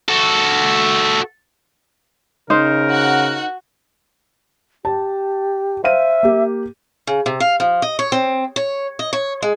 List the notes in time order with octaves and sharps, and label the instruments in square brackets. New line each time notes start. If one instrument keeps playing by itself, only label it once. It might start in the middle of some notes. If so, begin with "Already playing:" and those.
[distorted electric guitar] F#4 A4
[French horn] C#3 [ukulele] D#4 C5 [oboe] A#4
[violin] F#4 F#5
[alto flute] G4 [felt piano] A5
[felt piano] C5 F5 D#7 [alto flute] E5
[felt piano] A#3 G4
[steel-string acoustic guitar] C#3
C3
F5
F3
D#5
C#5
C4
C#5
D#5
C#5
G#3